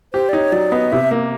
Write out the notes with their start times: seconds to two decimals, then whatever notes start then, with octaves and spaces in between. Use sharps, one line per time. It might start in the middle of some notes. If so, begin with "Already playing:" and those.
0.13 G4 C5
0.29 D5
0.33 D#4 C#5
0.52 F#3 D5
0.72 B3 D#5
0.92 C3 E5
1.11 A#3